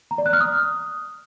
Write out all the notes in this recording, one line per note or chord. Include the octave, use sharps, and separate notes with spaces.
A#5
D5
F#6
F6
D#6